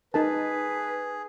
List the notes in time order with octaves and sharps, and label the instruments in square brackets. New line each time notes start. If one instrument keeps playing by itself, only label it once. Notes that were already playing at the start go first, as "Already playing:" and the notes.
[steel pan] D#4 A#4 A5 [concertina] G#4 [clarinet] B4